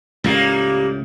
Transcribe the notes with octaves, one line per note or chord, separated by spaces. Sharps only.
C#2 A2 G3 A#3